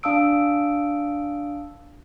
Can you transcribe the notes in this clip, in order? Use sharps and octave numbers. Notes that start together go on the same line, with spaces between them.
D4 F5 A5 D#6 E6 D7